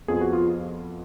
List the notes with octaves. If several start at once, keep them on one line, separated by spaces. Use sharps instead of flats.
F2 F3 B3 G#4
F#4
F4